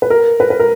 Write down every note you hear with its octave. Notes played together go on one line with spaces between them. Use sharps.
B4
A#4
B4
B4
A#4